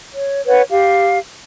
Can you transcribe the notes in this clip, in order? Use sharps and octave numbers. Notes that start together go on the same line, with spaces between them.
C#5
B4 C#5 F#5
G4 F5